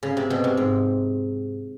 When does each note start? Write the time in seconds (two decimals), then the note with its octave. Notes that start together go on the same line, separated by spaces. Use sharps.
0.03 C#3
0.17 C3
0.30 B2
0.44 C3
0.57 G#2